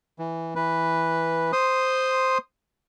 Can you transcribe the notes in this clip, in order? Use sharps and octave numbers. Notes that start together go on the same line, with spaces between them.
E3
E3 B4
C5 C6 D#6